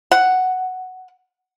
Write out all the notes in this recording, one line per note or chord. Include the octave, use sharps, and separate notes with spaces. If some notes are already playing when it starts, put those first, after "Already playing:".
F#5